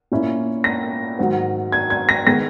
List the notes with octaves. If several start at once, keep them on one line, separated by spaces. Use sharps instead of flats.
A#2 A#3 C#4 E4
A#6
G#2 D#3 F#3
G#6
G#6
A#6
D#3 G#3 B3 A#6